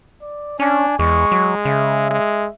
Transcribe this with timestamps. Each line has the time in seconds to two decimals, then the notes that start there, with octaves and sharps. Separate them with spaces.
0.22 D5
0.60 C#4 D4 G#5
0.99 E2 G#3 C#6
1.32 F#3
1.65 C#3 E5
2.10 G#3